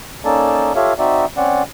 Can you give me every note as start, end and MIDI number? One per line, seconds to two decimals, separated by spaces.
0.25 0.73 58
0.25 0.73 61
0.25 0.73 63
0.25 0.73 69
0.25 0.73 74
0.25 0.73 81
0.76 0.93 65
0.76 0.93 67
0.76 0.93 69
0.76 0.93 73
0.76 0.93 76
0.76 0.93 77
0.99 1.25 60
0.99 1.25 63
0.99 1.25 66
0.99 1.25 74
0.99 1.25 76
1.37 1.63 60
1.37 1.63 61
1.37 1.63 74
1.37 1.63 78